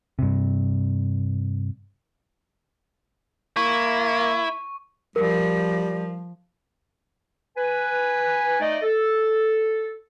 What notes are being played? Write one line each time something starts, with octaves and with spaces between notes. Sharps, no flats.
G2 C3
A#3 E4 C#6
F3 G3 A#4
B4 G#5
A3 D#4 D5 D#5
A4